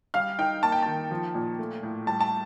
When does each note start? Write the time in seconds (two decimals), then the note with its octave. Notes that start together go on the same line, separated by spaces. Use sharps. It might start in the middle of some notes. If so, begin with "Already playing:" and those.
0.14 G3 F5 F6
0.39 D#4 G5
0.63 A#3 A5
0.72 G5
0.82 D#3 A5
1.11 F3
1.35 A#2
1.59 A3
1.83 A2
2.07 G3 A5
2.21 A5